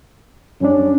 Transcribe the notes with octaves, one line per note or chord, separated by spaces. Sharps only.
F#2 G3 C#4 D4